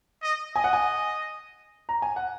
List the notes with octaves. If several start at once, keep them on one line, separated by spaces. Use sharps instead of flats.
D#5
D#5 G#5
F#5
G#5
A#5
G#5
F#5